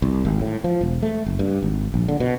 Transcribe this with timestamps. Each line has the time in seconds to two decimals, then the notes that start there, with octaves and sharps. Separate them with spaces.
0.02 C2
0.25 G#1
0.41 A2
0.64 F3
0.81 E1
1.03 A3
1.26 F#1
1.39 G2
1.62 G#1
1.94 A#1
2.08 D3
2.20 B2